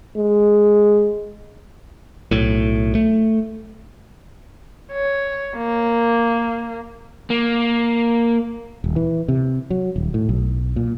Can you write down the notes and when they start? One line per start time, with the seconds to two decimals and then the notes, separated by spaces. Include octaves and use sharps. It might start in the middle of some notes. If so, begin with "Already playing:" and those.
0.17 G#3
2.31 B1 A2
2.95 A3
4.93 C#5
5.56 A#3
7.30 A#3
8.84 D#1
8.96 E3
9.28 C3
9.70 F#3
9.96 D#1
10.14 A2
10.29 B1
10.76 A#2